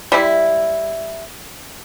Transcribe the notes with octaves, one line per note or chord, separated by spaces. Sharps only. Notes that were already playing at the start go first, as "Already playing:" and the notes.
G3 E4